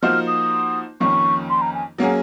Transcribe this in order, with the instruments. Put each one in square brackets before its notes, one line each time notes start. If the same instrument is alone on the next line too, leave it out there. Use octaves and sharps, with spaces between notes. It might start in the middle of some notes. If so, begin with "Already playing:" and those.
[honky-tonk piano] F3 A#3 D#4 F#4 C5 [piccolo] F6
[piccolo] D#6
[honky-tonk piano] F2 D#3 A#3 C#4 [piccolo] C#6
[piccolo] C6
A#5
G#5
[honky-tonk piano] F#3 A#3 C#4 G#4 [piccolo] F#5